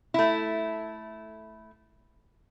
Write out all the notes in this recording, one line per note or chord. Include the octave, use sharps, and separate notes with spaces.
A3 E4